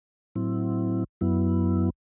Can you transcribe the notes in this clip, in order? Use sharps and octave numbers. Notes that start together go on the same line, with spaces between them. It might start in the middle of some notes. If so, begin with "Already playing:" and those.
A2 F#3 C4 E4
F#2 F#3 B3 E4